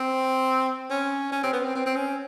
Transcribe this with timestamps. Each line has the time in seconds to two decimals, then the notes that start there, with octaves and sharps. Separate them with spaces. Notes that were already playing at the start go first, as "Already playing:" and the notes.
Already playing: C4
0.90 C#4
1.32 C#4
1.43 C4
1.53 B3
1.64 C4
1.75 C4
1.86 C4
1.96 C#4